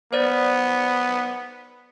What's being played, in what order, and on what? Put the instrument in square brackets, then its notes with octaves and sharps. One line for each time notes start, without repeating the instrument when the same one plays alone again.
[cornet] B3 [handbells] C5 D5 A6